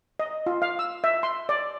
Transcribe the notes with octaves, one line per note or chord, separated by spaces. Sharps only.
D#5
F4
F5
E6
E5
C6
D5